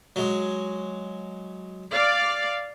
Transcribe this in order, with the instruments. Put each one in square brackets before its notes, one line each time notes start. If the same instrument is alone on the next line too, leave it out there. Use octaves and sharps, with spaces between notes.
[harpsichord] F#3 G#3
[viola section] D5 F5